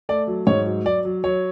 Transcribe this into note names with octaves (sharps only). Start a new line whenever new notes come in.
A3 D5
F#3
G#2 C#5
F#3
F#3 D5
F#3
F#3 C#5